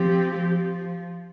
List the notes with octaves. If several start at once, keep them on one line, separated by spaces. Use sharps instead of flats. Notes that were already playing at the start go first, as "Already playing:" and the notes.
Already playing: F3 C4 G4
F3